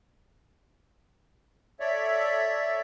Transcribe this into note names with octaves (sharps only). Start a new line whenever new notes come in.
A4 C#5 D5 E5